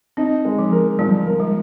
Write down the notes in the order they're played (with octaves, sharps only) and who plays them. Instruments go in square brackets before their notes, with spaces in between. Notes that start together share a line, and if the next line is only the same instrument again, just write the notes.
[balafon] C4 [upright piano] D#4
[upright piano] G#3
[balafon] F3
[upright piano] A#4
[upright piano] F3 [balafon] G3
[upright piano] A#4
[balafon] G#3